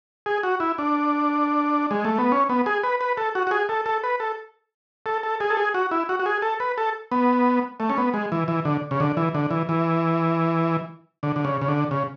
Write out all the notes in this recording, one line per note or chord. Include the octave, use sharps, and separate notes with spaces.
G#4
F#4
E4
D4
G#3
A3
B3
C#4
B3
G#4
B4
B4
A4
F#4
F#4
G#4
A4
A4
B4
A4
A4
A4
G#4
A4
G#4
F#4
E4
F#4
F#4
G#4
A4
B4
A4
B3
A3
C#4
B3
G#3
E3
E3
D3
C#3
D3
E3
D3
E3
E3
D3
D3
C#3
C#3
D3
C#3